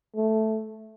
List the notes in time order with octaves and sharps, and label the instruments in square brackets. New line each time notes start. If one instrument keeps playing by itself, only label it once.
[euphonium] A3